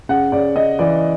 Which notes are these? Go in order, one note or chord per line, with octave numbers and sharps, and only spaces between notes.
C#3 F#5
C#3 D5
C#3 D#5
E3 D5